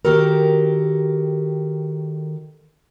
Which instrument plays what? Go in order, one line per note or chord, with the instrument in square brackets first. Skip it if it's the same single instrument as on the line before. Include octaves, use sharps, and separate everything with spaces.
[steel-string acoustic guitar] D#3 F#4 G4 A4 A#4